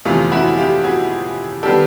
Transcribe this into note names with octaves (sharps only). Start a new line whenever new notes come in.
G1 F2 C3 E3 A3 F4
E4 F#4
F4 G4
F#4 G#4
D#3 G3 B3 G4 A4